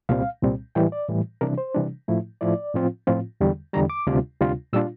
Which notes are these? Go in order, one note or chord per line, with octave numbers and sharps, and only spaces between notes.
C2 A#2 G3 C4 F5
C2 A#2 G3 C4
A2 E3 G3 G5
D5
A2 E3 G3
C3 E3 G3 D4 A#4
C5
C3 E3 G3 D4
A2 F3 A3 E4
A2 F3 A3 E4 D5
A2 F3 C4 F4
A2 F3 C4 F4
E2 D3 G3
E2 D3 G3 A#5
D6
D2 C3 G3 D4 F4
D2 C3 G3 D4 F4
A#2 G3 D4 F4 E6